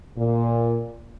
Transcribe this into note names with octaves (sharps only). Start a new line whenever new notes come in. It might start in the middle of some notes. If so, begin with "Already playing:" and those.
A#2